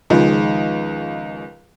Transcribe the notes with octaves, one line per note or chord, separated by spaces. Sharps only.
C#2 D#3 F3 G#3